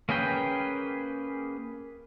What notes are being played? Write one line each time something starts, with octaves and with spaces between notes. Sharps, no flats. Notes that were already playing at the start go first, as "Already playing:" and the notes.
A#3 C#4 G#4 B4 G5